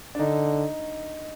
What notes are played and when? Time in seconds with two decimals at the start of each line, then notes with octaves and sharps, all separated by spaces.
0.15 D4
0.19 D3 D#4